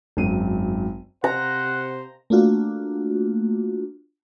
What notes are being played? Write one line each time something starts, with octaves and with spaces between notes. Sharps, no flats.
G#1 F#2 D#7
C3 C5 F#5 A#5
A3 A#3 D4 F4 F#4